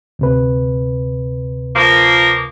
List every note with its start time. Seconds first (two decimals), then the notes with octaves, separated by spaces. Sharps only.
0.19 D2 C3 B4
1.76 F3 A#3